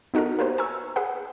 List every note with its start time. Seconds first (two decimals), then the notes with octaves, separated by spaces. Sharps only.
0.14 B3 D#4 F#4 A4 A#4
0.39 A#3 G4 B4 C5
0.58 G#5 A#5 C#6 E6
0.96 G#4 B4 F#5